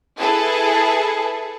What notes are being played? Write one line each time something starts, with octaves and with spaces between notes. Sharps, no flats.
E4 G#4 A4 B4 A5